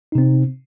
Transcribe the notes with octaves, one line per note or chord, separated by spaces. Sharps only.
C3 C4 D#4